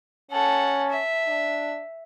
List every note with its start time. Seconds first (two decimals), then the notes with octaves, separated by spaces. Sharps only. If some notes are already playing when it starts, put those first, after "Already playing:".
0.32 C#4 A4 F#5
0.90 E5
1.28 D4